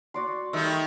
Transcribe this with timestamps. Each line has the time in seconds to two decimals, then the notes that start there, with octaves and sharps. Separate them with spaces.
0.14 F#4 D5 C6
0.53 D#3 G3 A3 E5